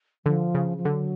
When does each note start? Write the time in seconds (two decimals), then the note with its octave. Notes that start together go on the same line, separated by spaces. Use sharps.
0.25 D3 F3
0.55 C#3
0.77 F3
0.85 D3 F#3